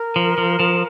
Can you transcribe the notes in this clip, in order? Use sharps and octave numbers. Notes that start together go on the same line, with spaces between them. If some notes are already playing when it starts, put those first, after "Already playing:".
Already playing: A#4
F3
F3
F3